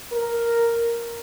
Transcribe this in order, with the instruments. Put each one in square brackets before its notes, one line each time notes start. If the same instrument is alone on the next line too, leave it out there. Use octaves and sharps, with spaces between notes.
[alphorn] A#4